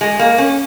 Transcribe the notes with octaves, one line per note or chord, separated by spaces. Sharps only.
G#3
A#3
C#4